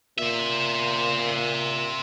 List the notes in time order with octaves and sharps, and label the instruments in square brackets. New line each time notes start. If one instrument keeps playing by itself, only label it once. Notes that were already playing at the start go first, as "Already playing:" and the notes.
[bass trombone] A#2 [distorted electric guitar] C5 E5